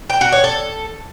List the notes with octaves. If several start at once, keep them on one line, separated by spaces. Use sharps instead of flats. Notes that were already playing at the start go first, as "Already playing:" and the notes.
G5
F#4
C#5
A4